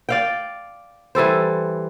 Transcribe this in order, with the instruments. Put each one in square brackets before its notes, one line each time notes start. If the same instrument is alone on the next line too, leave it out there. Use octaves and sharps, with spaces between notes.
[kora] D5 F5 G5
E3 G3 A4 C5